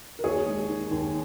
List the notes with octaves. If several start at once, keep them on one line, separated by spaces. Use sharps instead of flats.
A#4
D#2 G#4 C#5
G#3
D#3
D#2